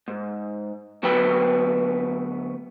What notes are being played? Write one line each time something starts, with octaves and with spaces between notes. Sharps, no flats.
G#2
D2 F#3 B3 B4 G5 B5